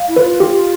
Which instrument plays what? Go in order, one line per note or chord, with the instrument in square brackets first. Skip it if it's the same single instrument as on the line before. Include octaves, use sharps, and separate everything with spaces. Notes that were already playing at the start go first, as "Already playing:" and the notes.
Already playing: [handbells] F5
[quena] E4
[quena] F4 [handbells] B4
[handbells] G4